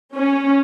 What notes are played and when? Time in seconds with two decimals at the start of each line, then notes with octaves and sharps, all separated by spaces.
0.15 C#4